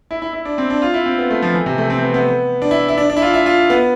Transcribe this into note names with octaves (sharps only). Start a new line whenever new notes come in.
E4
E4
E4
D4
C4
D4
F4
E4
C4
B3
A3
F3
E3
C3
A3
C4
B3
B3
D4
E4
E4
D4
D4
E4
F4
E4
F4
B3